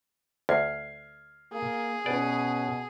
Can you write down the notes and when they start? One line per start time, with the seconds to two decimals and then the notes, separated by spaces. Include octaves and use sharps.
0.49 D2 F6 G#6 C7
1.53 A#3 G#4
2.06 B2 C#4 B4 D5